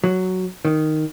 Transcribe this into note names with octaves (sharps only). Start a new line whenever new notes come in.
F#3
D#3